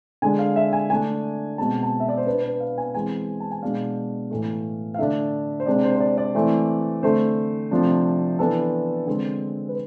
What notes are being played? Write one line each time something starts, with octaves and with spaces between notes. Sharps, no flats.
D3 G#3 D4 G#5
F5
E5
G#5
D3 A3 D4 G#5
B2 G#3 C4 A5
A5
E5
D5
C5
B2 B3 D4 B4
B4
F5
G#5
E3 G#3 C4 G#5
A5
G#5
B2 G#3 D4 F5
A2 E3 A3
F5
D3 A3 D4 E5
C5
C3 G#3 D4 D5
C5
C5
D5
D5
E3 A3 C4
D3 A3 C4 C5
C3 F3 A3 D4
E3 B3 D4 A4
D3 G#3 C4 G#4
B4